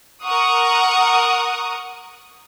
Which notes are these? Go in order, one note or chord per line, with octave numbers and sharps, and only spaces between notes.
A#4 F#5 C#6 D#6